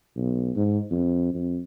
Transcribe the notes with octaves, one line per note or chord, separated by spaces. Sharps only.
B1
G#2
F2
F2